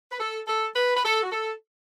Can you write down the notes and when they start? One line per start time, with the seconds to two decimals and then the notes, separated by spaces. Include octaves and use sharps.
0.11 B4
0.20 A4
0.47 A4
0.75 B4
0.96 B4
1.04 A4
1.23 F#4
1.31 A4